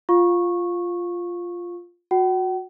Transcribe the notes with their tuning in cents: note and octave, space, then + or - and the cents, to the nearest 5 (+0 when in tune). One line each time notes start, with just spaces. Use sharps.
F4 +0 F5 +20 C#6 -15
F#4 -20 F#5 +45